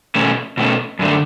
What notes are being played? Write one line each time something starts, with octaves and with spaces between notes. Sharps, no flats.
B2 A3 C#4
B2 A3 C#4
F#2 D3 A3